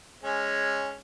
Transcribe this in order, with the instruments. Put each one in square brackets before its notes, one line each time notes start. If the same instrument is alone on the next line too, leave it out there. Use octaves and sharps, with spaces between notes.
[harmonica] G#3 C#4